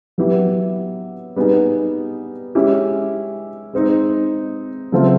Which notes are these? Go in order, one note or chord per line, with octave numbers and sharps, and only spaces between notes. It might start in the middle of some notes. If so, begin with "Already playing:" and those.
F#3 B3 E4 G4
G3 B3 D#4 G#4
G#3 C#4 E4 G4
G#3 C4 D#4
C#3 F#3 A3 C4 F4